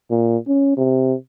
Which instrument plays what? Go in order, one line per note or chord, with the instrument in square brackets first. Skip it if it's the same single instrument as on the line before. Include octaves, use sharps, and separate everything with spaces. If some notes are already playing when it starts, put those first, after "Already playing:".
[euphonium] A#2
C#4
C3